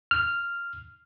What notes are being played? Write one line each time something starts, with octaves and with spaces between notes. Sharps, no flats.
F6